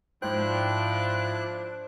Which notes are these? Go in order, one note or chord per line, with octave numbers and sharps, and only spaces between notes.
G#2 F3 D4 E4 C5 G5 F#6